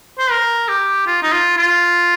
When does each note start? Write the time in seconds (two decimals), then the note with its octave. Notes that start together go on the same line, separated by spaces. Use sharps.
0.18 C5
0.31 A#4
0.68 G4
1.07 F4
1.22 D#4
1.32 F4
1.57 F4